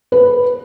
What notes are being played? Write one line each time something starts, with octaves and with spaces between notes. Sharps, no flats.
B4